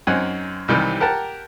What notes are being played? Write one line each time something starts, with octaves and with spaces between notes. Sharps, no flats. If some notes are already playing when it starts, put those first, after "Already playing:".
F#2 C4 D#4 F#5 G#5
C2 C3 D#3 E3 G3
G4 A#4 F#5 A5